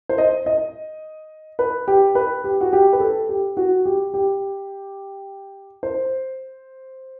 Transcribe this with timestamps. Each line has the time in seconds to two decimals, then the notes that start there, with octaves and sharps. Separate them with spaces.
0.09 C5
0.18 D#5
0.46 D#5
1.59 B4
1.88 G4
2.15 B4
2.44 G4
2.61 F#4
2.73 G4
2.93 B4
3.00 A4
3.29 G4
3.57 F#4
3.86 G4
4.14 G4
5.83 C5